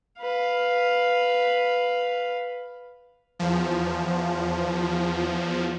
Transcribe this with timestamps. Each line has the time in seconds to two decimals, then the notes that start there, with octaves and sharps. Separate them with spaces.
0.21 B4 F5
3.39 E2 F3